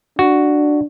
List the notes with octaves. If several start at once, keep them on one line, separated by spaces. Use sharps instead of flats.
D4 F#4